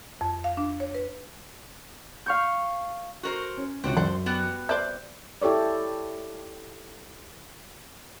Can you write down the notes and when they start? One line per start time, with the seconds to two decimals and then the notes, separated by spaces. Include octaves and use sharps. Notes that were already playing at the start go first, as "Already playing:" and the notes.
0.21 F2
0.44 F5
0.57 D4
0.80 C#5
0.94 B4
2.26 F5 C#6 G6
3.23 F#4 A#4 C5
3.57 C#4
3.84 C#2 C3 C4 D4 F#4
3.97 F#2 C5 D5 F#5
4.26 G3 B3 F#4
4.69 C5 D5 E5 G6
5.42 E4 G4 A4 C#5 D5